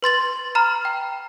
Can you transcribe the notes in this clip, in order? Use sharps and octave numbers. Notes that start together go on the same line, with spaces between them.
B4 C6 A6 F#7
A#5 B5 F6
G5